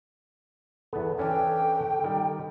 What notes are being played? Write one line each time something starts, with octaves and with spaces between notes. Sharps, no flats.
E2 B3 A4
E3 C#4 D4 G5
D#3 G3